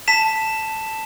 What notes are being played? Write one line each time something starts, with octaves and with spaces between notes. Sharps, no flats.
A5 B6 E7